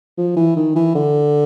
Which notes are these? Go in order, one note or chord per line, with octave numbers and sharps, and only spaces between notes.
F3
E3
D#3
E3
D3